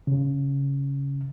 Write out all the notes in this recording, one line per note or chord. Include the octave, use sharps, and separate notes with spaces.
C#3